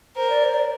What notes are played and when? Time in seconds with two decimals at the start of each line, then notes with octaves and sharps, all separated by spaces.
0.16 A#4 C5
0.30 D5
0.45 C5
0.54 D5